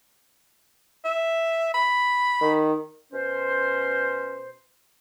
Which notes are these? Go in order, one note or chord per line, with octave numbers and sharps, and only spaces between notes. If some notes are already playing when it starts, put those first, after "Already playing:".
E5
B5
D#3
B2 C#4 C5